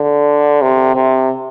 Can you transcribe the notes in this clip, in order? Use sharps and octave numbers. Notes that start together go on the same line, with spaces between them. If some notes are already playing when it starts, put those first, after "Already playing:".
Already playing: D3
C3
C3